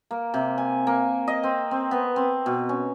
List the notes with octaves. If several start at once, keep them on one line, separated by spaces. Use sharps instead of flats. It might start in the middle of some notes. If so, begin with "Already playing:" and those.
A#3
C3
G#5
A#3
D#5
C4
C4
B3
C4
B2
C#4